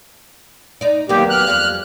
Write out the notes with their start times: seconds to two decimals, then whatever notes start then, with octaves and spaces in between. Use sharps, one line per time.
0.81 D#4 D5
1.09 D#2 F#3 A#3 B3 G4
1.30 F6 F#6
1.47 F2 G3 F5